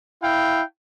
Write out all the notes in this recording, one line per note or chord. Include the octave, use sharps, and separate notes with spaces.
E4 F5 G5